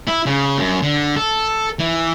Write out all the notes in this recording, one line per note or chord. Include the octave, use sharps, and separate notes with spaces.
E4
C#3
F#2
D3
A4
E3